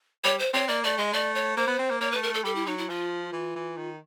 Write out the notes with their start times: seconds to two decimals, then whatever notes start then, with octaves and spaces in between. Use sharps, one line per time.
0.24 G3 C#5
0.39 C5
0.53 C4 C#5
0.68 A#3 D5
0.84 A3 D5
0.98 G#3 D#5
1.13 A3 D5
1.35 C#5
1.57 A#3 C5
1.67 B3
1.79 C4
1.90 A#3
2.01 A#3 C#5
2.12 A3 B4
2.23 A#4
2.30 A3 A4
2.44 G3 A4
2.55 E4
2.66 F#3 D#4
2.78 E4
2.89 F3 F4
3.32 E3
3.56 E3
3.77 D#3